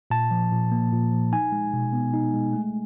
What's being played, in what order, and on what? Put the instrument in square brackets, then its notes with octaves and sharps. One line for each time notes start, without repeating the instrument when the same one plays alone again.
[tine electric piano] A#2 A5
F3
A#2
A#3
A#2
F3
D#4 G#5
G#3
B2
B3
D#4
G#3
A3